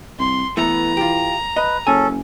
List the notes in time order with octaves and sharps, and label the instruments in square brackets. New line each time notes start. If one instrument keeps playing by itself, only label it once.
[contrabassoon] C2 [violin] C6
[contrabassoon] E3 [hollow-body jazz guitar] A3 B3 [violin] A#5
[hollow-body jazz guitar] F4 G4
[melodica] B4 [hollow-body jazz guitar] D#5
[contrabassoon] F#1 [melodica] C#4 A4 [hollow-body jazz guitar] G#5